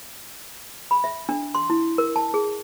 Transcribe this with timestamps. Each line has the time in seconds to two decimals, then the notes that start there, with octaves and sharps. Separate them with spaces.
0.91 B5
1.04 E5
1.29 D4
1.55 C6
1.70 E4
1.98 A#4
2.16 A5
2.34 G#4